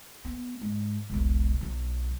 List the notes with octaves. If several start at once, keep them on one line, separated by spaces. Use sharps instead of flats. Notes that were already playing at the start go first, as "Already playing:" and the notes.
B3
G#2
E1 B1
B1 F#3